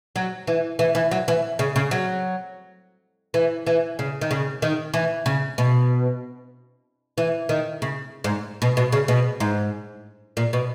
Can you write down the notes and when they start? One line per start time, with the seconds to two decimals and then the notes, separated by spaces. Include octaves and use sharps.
0.16 F#3
0.47 E3
0.79 E3
0.95 E3
1.11 F#3
1.28 E3
1.59 C#3
1.76 C#3
1.91 F#3
3.34 E3
3.67 E3
3.99 C#3
4.21 D#3
4.31 C#3
4.62 D#3
4.94 E3
5.26 C#3
5.58 B2
7.18 E3
7.49 D#3
7.82 C#3
8.24 G#2
8.62 B2
8.77 B2
8.92 C#3
9.08 B2
9.40 G#2
10.37 A#2
10.53 B2